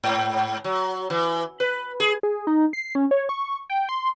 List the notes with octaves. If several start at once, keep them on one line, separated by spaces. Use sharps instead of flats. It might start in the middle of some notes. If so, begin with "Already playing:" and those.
G#2
F#3
E3
B4
G#4
G#4
D#4
C7
C#4
C#5
C#6
G5
C6